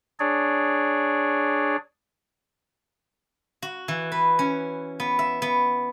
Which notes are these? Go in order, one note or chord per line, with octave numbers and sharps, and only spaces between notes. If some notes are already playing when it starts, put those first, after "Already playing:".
D4 G#4 C#5 D5
F#4
E3
B4
C#4
B3
E5
B3